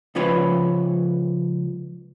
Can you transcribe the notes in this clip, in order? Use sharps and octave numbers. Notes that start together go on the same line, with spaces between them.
C#2 F3 C#4 F4 B4 C#5